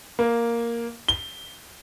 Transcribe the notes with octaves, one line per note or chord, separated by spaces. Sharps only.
A#3
G7